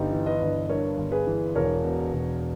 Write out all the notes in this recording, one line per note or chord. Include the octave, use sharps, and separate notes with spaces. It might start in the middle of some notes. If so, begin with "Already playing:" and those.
Already playing: G1 D#4 G4
E3
B4 D#5
G1
G2 A#4 C#5
G1
G#4 B4
E3
E1 A#4 C#5
B2
E1